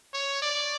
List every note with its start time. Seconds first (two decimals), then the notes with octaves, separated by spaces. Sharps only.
0.13 C#5
0.42 D5